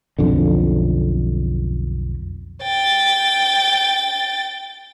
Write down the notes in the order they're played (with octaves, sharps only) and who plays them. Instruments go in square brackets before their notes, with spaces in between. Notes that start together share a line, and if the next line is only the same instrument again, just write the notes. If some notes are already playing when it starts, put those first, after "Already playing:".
[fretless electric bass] B1 F2 D3
[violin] G5 A6